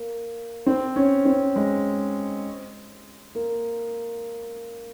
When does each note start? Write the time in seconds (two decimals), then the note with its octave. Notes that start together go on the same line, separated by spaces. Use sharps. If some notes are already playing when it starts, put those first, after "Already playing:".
Already playing: A#3
0.66 C4
0.96 C#4
1.25 C4
1.56 G#3
3.35 A#3